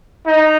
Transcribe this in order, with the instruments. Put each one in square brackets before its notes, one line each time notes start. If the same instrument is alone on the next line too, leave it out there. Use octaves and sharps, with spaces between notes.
[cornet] D#4